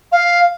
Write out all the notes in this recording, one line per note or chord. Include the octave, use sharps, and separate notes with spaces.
F5